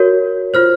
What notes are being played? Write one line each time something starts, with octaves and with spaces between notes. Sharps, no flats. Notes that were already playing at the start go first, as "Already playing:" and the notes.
Already playing: F#4 A#4 C#5
F4 C5 F6